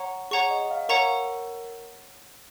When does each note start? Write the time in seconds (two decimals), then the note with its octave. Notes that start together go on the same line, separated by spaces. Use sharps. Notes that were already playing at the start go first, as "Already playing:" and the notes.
Already playing: C#5 F#5 A#5 C#6
0.31 G#4 C#5 F#5 A#5 C#6
0.50 D#5
0.71 F5
0.89 A#4 C#5 F#5 A#5 C#6